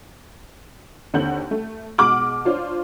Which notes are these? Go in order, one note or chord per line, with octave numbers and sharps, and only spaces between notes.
D#2 D3 C4 F#5 G6 F#7
A3
B2 G#3 F#5 D6 F6 F#7
D4 F4 C5 C#5